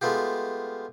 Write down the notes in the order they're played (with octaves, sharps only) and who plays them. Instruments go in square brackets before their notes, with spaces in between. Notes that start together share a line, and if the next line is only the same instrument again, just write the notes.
[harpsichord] G#3 A3 B3 F4 G4